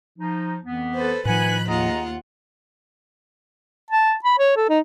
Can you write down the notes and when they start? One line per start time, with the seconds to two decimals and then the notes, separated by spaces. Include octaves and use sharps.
0.19 F3 D#4
0.64 F2 E3 B3
0.94 A4 B4 C5
1.25 A2 D#3 F3 B4 F#5 G#5 B5 F#6
1.67 D#2 F4 G#4 D#5 F#5 A#5
3.91 A5
4.25 B5
4.39 C#5
4.56 A4
4.69 D#4